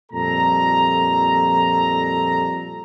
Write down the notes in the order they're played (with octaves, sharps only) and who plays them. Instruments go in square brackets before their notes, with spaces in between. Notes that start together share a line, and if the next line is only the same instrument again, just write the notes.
[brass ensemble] F2 A#2 G3 A4 A#5